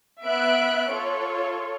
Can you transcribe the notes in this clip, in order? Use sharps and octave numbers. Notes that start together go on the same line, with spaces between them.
B3 E5 F#6 D7
F4 A4 C#5